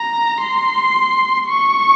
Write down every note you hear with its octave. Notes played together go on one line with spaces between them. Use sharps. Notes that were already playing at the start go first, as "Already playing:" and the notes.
Already playing: A#5
C6
C#6